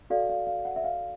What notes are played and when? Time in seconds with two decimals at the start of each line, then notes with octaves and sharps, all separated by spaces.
0.10 F#4 A4 D5 F5
0.29 F5
0.47 F5
0.65 F#5
0.76 E5
0.84 F5